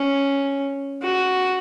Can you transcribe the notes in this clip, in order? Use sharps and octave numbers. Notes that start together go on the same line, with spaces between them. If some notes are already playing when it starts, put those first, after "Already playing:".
Already playing: C#4
F#4